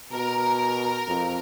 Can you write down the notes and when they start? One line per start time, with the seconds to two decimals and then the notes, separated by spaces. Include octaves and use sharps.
0.12 B2 A#4
1.07 F2